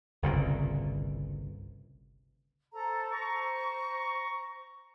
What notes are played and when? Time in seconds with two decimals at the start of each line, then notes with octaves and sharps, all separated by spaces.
0.22 G1 C2 A#2 C#3
2.73 A4 C5 A#5
3.12 C5 A#5 C#6